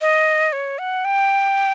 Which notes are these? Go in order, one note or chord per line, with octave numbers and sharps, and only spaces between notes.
D#5
C#5
F#5
G5